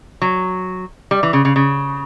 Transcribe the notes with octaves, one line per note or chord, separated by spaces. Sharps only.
F#3
G3
E3
C#3
C#3
C#3